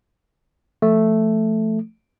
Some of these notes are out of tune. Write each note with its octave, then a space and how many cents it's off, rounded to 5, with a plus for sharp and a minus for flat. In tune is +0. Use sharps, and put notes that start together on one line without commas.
F3 -25 A3 +0